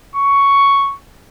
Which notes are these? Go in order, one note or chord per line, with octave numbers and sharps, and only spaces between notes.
C#6